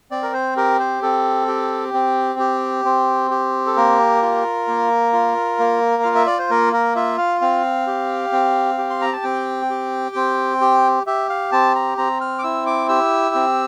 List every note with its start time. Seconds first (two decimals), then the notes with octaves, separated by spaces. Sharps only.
0.11 C4 D5
0.23 A#4
0.34 C5
0.57 G4 A#4
0.80 C5
1.02 C4 A4
1.48 G4
1.94 C4
2.39 G4
2.85 C4
3.31 G4
3.66 A4
3.76 A#3 A#4
4.22 F4
4.68 A#3
5.13 F4
5.59 A#3
6.03 F4 F5
6.15 E5
6.26 D5
6.39 C5
6.50 A#3 A#4
6.73 A#4
6.96 F4 E5
7.18 F5
7.41 C4 F5
7.87 G4
8.32 C4
8.78 G4
8.90 C6
9.02 A#5
9.13 A5
9.24 C4 G5
9.70 G4
10.16 C4
10.61 G4
11.07 G4 E5
11.30 F5
11.52 C4 A5
11.75 A#5
11.98 C4 A#5
12.21 F6
12.39 D6
12.44 E4 E6
12.66 D6
12.89 G4 E6
13.35 C4